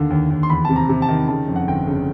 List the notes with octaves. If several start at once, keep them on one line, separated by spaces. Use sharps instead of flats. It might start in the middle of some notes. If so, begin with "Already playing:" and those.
Already playing: D#2 D3
D#2
D#2
C6
E2 B5
C3 A5
A#5
C3
A5
D#3
C#3 A5
F2
F#5
G1 G5
C#3